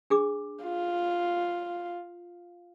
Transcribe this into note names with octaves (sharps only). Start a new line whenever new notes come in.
D4 G#4 D6
F4